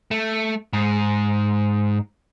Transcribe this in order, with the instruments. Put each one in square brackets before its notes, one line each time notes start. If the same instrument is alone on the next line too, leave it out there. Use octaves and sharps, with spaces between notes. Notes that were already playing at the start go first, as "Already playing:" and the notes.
[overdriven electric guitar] A3
G#2